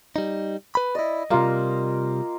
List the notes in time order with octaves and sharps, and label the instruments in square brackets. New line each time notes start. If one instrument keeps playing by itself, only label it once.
[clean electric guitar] G3 D#4
B4 B5
[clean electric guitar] E4 D5 [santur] D#5
[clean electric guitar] C3 G3 [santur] A#3 F4 A#4